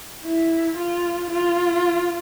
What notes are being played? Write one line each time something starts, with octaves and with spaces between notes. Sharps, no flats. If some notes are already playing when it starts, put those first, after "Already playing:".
E4
F4
F4